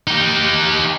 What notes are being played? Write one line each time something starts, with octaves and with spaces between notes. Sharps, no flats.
D#4 G4